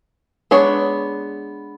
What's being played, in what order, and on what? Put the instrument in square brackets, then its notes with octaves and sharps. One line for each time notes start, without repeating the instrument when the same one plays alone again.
[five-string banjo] G#3 B3 D4 G#4 C#5